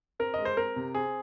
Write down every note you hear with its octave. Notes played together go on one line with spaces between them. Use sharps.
C4 A#4
G#3 D#5
C5
C4 A#4
C3
C4 G#4